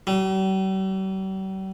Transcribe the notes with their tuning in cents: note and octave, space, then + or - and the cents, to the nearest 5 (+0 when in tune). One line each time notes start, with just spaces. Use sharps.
G3 -45